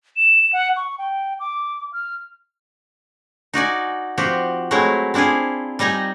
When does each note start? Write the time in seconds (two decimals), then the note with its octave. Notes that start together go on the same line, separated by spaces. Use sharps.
0.16 E7
0.53 F#5
0.77 C#6
0.98 G5
1.40 D6
1.93 F6
3.53 D#4 F#4 D5 G#5
4.18 F3 C4 F#4 G4
4.71 F#3 G#3 A3 C4 E4
5.14 C4 D4 E4 F4 G#4
5.79 G3 D#4 D#5 G#5 A#5